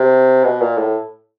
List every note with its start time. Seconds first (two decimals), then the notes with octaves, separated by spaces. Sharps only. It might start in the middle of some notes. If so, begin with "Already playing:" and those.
Already playing: C3
0.44 B2
0.62 A#2
0.78 A2